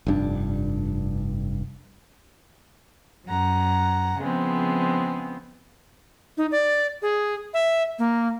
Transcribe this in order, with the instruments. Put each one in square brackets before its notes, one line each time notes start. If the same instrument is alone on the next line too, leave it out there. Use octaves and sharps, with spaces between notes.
[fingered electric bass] F1 G2 D4
[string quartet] F#2 F#5 A#5
C#3 F3 G#3 B3 C4
[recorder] D#4
D5
G#4
E5
A#3